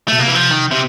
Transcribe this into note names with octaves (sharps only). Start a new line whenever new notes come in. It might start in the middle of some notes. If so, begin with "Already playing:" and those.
B2 A3
C3 A#3
E3
F3
D#3
C3